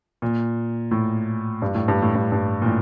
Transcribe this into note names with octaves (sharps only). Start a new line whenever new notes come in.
A#2
A2
G2
A2
G2
A2
G2
G2
A#2
A2